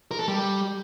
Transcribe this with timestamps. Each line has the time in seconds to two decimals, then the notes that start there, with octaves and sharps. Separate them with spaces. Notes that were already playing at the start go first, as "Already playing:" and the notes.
0.11 A#4
0.20 A4
0.28 G3